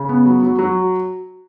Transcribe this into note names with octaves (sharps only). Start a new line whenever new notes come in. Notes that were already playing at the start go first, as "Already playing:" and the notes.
Already playing: C#3
B3
F#3
F#3
F#3